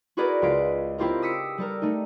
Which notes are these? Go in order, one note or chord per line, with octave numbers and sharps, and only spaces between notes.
E4 F#4 G#4 A#4 B4 D5
C#2 G#3 F4 B6 D7
C4 E4 F4 G4 A#4
D#6 E6 B6 C#7 D7
G3 A4 A#4
A3 D#4